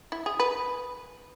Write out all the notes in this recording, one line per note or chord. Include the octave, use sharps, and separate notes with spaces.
E4
G#4
B4